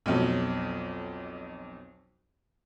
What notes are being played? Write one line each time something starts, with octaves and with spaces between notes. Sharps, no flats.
B1 F2 F#3